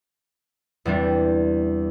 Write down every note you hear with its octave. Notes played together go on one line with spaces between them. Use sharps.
E2 C3 G3 C4 D4